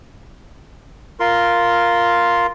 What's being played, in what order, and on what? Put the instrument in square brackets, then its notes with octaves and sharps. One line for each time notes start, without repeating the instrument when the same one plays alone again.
[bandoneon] F4 A#4 C6